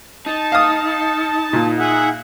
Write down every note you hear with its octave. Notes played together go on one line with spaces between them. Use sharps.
D#4 A5
F5 D#6
A#2
G#4 E5 F#5